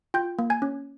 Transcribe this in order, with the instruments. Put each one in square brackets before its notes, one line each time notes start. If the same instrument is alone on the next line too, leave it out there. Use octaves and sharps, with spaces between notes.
[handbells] F4 G5 G6
A#3
G#5 G#6
C#4